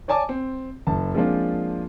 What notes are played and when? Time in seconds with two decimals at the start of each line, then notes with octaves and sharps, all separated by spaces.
0.08 C#5 D5 G#5 A5 D6
0.29 C4
0.87 F#1 A5
1.15 F3 G#3 A#3 C4 D4 F4